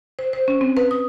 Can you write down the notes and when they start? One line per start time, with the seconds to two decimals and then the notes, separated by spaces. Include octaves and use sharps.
0.19 C5
0.33 C5
0.48 C#4
0.61 C4
0.77 B4
0.91 D#6